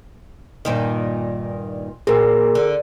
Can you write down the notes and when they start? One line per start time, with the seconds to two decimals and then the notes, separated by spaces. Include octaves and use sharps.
0.65 G2 A#2 D#3
2.07 A#2 G#4 A#4
2.55 D3